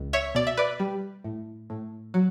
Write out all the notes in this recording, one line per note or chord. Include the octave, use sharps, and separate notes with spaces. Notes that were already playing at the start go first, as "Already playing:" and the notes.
Already playing: C#2
C#5 E5
B2 D5
E5
B4 D5
G3
A2
A2
F#3